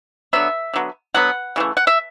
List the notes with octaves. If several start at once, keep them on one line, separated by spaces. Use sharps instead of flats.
D3 F#3 B3 E5
D3 F#3 B3
D3 F#3 B3 F#5
C#3 E3 A3
F#5
E5